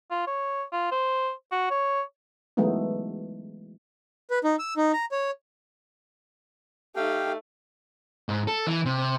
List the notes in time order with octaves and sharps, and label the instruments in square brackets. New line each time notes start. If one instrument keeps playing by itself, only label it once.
[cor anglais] F4
C#5
F4
C5
F#4
C#5
[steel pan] E3 F#3 G#3 A3 B3 D#4
[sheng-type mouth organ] B4
D#4
E6
D#4
A#5
C#5
[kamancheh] A3 D#4 [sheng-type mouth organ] G4 F5 G5
[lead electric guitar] G#2
A4
E3
C3